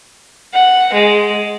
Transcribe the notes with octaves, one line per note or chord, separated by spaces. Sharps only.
F#5
G#3